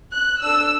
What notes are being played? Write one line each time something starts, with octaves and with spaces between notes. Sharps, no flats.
F#6
D4 A4 E6